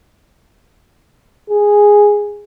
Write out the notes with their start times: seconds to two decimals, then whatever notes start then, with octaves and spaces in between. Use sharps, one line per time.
1.49 G#4